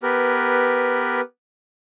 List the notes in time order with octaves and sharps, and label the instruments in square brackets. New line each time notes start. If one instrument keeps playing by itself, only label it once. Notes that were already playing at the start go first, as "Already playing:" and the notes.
[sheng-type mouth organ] B3 G4 A#4 B4